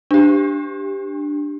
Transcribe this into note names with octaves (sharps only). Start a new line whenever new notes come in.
D4 G4